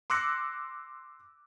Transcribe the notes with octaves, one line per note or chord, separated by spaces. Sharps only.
C6 D6 E6 F#6 A#6 C#7